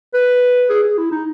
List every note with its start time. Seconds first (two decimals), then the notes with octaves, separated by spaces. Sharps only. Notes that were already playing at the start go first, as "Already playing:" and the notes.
0.14 B4
0.70 G#4
0.84 G#4
0.98 E4
1.11 D#4